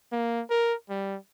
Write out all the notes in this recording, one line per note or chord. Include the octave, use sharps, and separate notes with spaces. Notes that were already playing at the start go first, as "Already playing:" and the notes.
A#3
A#4
G3